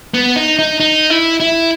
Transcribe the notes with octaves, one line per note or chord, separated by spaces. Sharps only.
B3
D#4
D#4
D#4
E4
E4